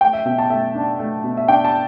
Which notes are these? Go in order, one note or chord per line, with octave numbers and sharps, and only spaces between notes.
A3 G5
E5
B2 E5
A5
A3 E5
D4
A3
B2
E5
D4 G5
A5